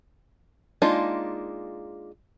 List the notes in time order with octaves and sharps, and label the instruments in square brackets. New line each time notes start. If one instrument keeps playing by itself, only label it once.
[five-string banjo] G#3 A#3 D4 D#4 F4